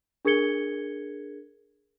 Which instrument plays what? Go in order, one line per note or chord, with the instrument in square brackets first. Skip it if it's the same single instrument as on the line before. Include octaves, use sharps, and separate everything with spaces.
[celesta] D4 G#4 A#4 G#6 C#7 G7